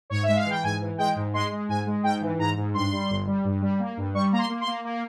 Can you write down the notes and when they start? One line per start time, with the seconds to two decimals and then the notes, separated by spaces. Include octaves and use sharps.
0.10 G#2 C#5
0.23 E5
0.28 G#3
0.36 F5
0.45 E3 G5
0.63 G#2 G#5
0.81 E3
0.98 G#3 G5
1.16 G#2
1.33 G#3 C6
1.51 G#3
1.68 G#2 G#5
1.86 G#3
2.03 G#2 G5
2.21 E3
2.39 G#2 A#5
2.57 G#2
2.74 G2 C6
2.92 G3
3.09 G1
3.27 G3
3.44 G2
3.61 G3
3.79 A#3
3.97 G2
4.14 G3 C#6
4.32 A#3 A#5
4.38 C6
4.49 A#3
4.61 C6
4.67 A#3
4.85 A#3